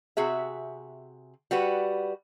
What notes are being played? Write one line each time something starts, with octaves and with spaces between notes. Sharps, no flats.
C3 F#4 G#4 E5
G3 F#4 B4